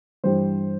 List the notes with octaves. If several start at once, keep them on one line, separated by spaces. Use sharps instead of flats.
G2 E3 G3 C5